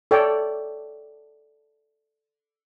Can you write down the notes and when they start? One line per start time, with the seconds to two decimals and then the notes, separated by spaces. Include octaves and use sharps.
0.11 A4 C#5 D5 G5